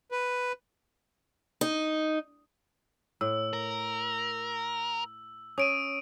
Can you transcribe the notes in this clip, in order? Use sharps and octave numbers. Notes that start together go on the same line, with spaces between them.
B4
D#4
A2 E6
A#4
C#4 D#6 D7 D#7